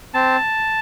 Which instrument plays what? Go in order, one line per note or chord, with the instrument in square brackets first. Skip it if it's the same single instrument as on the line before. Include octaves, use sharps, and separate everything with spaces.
[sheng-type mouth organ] C4 A5